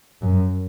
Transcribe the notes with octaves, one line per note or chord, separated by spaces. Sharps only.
F#2